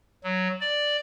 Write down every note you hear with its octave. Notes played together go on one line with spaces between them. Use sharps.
F#3
D5